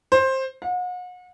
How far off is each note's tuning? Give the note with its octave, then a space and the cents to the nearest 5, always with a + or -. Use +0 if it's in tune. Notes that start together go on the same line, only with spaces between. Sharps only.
C5 +15
F#5 -40